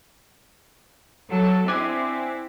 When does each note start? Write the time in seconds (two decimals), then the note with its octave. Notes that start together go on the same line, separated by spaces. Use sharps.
1.30 F#3 A4
1.68 C4 D4 E4 G#4 G#5